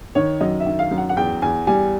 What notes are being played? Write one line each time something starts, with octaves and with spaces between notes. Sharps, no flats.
D#3 C#5
F#2 D#5
E5
D#3
F5
F#2
F#5
F#5
E2 G5
E2 G#5
G3 G#5